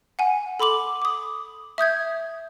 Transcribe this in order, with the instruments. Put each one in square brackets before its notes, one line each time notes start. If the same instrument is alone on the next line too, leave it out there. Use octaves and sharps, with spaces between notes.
[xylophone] F#5 G#5
A4 B5 C6 D6 F#7
D6 D#6
E5 D#6 G6 G#6